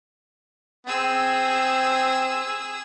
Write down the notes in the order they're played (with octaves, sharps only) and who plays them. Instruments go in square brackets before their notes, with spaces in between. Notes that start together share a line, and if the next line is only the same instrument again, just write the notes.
[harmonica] C4 [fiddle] G#4 E6